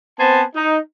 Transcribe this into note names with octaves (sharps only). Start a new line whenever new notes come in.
B3 C4 C5 G#5 A5
D#4